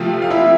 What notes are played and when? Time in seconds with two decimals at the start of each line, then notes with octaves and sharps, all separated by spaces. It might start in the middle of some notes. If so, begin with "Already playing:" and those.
Already playing: C3 F3 A3 C4 F4
0.22 F5
0.30 E4 E5